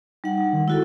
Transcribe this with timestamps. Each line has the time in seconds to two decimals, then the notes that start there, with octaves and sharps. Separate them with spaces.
0.24 G3 D#4 F#5
0.53 D#3
0.68 G#3 E4 F#4 A4